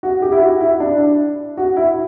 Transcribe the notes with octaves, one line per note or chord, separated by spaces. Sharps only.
F#4
G4
E4
F#4
E4
D4
F#4
E4